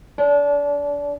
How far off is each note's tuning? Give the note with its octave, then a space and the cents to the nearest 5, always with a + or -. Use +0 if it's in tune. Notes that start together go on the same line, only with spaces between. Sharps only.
D4 -30